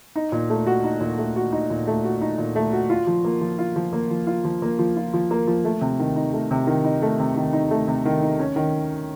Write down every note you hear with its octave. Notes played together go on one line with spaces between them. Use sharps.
D#4
A#2
A3
F#4
D#4
A#2
A3
F#4
D#4
A#2
A3
F#4
D#4
A#2
A3
F#4
F4
F3
A#3
F3
F4
F3
A#3
F3
F4
F3
A#3
F3
F4
F3
A#3
F3
A3
C3
D#3
D#4
A3
C3
D#3
D#4
A3
C3
D#3
D#4
A3
C3
D#3
D#4
C#4
D#3